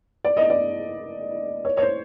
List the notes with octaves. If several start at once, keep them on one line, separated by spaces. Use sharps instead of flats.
D5
D#5
D5
C#5
C#5
C5